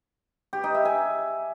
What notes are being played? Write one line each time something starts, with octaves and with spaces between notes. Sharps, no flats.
G4
D#4
E5
G#5